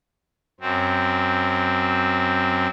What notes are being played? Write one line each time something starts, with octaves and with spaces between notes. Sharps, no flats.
F#2 C4